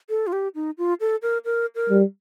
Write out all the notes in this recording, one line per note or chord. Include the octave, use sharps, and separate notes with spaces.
A4
F4
G4
D#4
F4
A4
A#4
A#4
A#4
G3